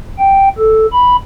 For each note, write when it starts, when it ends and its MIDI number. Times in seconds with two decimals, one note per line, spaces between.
0.18 0.48 79
0.58 0.86 69
0.93 1.17 83